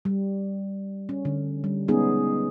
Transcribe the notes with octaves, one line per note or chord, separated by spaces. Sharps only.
G3
C#4
D3
G3
G#3 B3 C#4 D#4 G#4